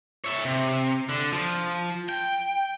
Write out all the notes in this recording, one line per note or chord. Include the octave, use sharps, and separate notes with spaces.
C#5 E5
C3
D3
F3
G5